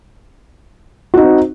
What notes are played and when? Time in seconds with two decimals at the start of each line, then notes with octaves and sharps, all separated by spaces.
1.14 F#4
1.17 D#4
1.21 C4